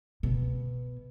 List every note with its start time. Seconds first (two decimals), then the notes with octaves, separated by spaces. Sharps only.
0.23 B2